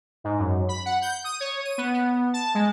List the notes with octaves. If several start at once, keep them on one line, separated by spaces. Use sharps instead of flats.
G#2
F#2
B5
F#5
G6
D#6
C#5
D#7
B3
B3
A5
G#3